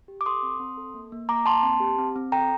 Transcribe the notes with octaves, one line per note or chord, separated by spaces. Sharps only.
G4
D6
A4 C6 D#6
C4
C4
A4
A#3
A#3
A#3 A#5 D6
A#3 A5 C6
C4
G4
C4
C4
A4 G5 A#5